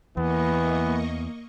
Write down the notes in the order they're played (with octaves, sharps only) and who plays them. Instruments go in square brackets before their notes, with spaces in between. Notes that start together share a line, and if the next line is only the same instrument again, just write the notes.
[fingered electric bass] E2 [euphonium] E3 [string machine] A#3 D#5 C#6 [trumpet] B3